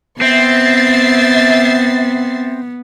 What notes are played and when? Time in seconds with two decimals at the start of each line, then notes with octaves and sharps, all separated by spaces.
0.21 B3 C4 E5 A6 C7